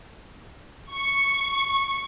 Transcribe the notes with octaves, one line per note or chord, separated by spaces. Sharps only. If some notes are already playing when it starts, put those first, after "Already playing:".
C#6